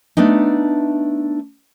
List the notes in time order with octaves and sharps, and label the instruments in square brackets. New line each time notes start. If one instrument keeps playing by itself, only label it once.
[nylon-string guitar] A3 B3 D4 D#4